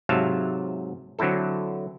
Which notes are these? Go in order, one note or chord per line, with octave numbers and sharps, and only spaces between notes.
G#2 C3 F#3 E5 F5 A5
D3 F#3 C4 E4 A4